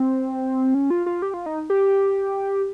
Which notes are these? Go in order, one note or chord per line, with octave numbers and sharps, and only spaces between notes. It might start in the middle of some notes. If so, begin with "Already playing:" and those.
Already playing: C4
C#4
F4
F4
G4
F4
D#4
G4